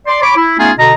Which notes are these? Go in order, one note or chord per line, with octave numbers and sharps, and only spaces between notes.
D5 C6
C#5 B5 D6
E4
A3 B3 C#4 D#4 F4 G#4
B2 D3 D#5 A#5